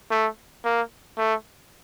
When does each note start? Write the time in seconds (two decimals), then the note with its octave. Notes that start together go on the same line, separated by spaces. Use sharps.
0.11 A3
0.65 A#3
1.18 A3